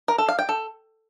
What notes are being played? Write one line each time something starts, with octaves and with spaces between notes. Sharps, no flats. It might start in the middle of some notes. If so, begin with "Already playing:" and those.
A#4
A4
F5
G5
A4